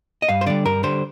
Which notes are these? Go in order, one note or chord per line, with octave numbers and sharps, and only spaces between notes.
D#5
G2 F5
C5
D3 G3 D5
G2 A#4
D3 G3 C5